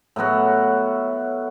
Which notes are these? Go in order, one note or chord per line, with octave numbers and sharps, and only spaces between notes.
A2 F#3 B3 F#4